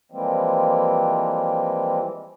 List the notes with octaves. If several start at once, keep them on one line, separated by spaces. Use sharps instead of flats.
E3 F3 G3 G#3 A#3 C4